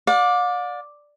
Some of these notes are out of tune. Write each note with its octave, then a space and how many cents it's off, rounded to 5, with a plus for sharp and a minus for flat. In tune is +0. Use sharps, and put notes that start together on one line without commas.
D5 +0 F5 +45